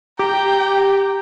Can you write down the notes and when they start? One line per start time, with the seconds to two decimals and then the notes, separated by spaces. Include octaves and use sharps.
0.19 G4 G5 A#5